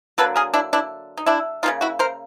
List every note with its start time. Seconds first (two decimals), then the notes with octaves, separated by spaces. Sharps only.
0.18 D3 F#3 A#3 A4 B4
0.36 G#4 A#4
0.54 D4 E4
0.73 D4 E4
1.17 D#4
1.26 D4 E4
1.63 C#3 F3 A#3 D#4 F4
1.81 E4 F#4
1.99 A#4 C5